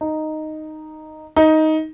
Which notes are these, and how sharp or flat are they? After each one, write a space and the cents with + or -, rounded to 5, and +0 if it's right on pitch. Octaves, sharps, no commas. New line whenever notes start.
D#4 -5
D#4 +10